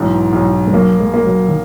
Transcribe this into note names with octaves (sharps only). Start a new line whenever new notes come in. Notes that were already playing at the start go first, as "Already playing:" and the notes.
Already playing: B1 G#2 E3
B1
G#3
F#3 A#3
G#3
A#3
F#3
D#3